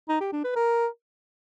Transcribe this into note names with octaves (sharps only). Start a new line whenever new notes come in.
D#4
G4
D4
B4
A#4